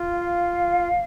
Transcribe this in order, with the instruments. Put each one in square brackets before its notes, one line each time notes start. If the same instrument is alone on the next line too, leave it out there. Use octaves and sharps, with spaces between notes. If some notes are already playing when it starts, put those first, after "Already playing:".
Already playing: [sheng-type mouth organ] F4
[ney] F5